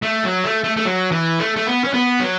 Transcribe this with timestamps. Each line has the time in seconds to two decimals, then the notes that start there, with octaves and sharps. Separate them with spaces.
0.03 A3
0.24 F#3
0.44 A3
0.64 A3
0.77 A3
0.85 F#3
1.11 E3
1.40 A3
1.56 A3
1.67 B3
1.84 C#4
1.93 B3
2.20 F#3